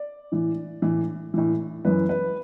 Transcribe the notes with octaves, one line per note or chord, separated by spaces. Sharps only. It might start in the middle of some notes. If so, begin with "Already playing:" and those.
Already playing: D5
A2 E3
A2 E3
A2 E3
F#2 E3 B4
B4